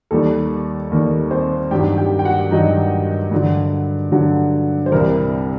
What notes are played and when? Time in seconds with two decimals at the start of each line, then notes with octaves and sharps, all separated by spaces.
0.11 D#2 D#3 G3 A4
0.91 D#2 D#3 G3 A#4
1.31 C4 C5
1.71 G2 D#3 F#3 G4 G5
1.98 G4 G5
2.19 G5
2.25 F#4 F#5
2.51 G2 D#3 F#3 D#4 D#5
3.31 G2 D3 F#3
4.12 G2 D3 F#3
4.86 C5
4.92 C2 C3 G3 A#4